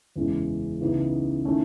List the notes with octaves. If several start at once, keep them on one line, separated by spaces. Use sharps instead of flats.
F#1 E2 C#3 E3 G#3
C#2 C#3 E3 B3 D#4
D#3 A3 C#4 E4